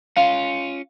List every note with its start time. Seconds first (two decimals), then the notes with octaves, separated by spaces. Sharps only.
0.17 C#4 F4 F5